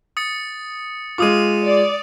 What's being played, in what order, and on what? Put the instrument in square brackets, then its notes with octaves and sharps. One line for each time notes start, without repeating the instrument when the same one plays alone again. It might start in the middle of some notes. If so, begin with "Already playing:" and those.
[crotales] D#6 A6 C#7
[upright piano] G#3 F4 [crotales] D6 D#6 D#7
[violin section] D5